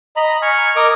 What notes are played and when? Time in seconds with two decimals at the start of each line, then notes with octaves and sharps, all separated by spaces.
0.16 D#5 A#5 B5
0.42 G#5 C#6 F6
0.76 A#4 D#5 D6 D#6